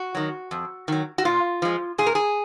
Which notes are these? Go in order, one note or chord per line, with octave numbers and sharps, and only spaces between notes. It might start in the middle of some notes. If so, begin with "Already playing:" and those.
Already playing: F#4
D#3 F#3
F2
D#3 F#3
F#4
A#2 F4
F3 G#3
A#2 G#4
A#4
G#4